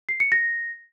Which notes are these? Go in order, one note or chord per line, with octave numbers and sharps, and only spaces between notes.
C7
C#7
A#6